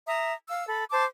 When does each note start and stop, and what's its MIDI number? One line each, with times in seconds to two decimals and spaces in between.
0.07 0.33 76
0.07 0.33 82
0.07 0.33 87
0.49 0.65 77
0.49 0.65 88
0.68 0.85 69
0.68 0.85 83
0.91 1.05 72
0.91 1.05 81
0.91 1.05 86